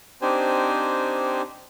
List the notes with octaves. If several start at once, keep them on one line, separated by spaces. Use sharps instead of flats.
C4 D4 D#4 G4 C5 G#5